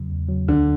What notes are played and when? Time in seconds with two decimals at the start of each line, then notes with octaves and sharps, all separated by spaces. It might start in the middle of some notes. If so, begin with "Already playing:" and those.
Already playing: E2 C#3 F#3
0.10 E2
0.29 C#3 F#3
0.48 D2 D3